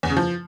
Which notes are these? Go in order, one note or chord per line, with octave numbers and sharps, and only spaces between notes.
E2
C#3
F3